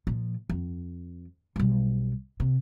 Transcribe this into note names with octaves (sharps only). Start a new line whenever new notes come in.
A#2 F3
F2
B1 G3
C3